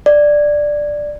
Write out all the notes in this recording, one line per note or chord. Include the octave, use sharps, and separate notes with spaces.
D5